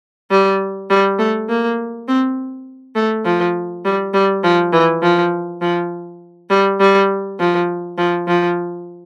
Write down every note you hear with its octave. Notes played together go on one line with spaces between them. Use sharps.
G3
G3
A3
A#3
C4
A3
F3
G3
G3
F3
E3
F3
F3
G3
G3
F3
F3
F3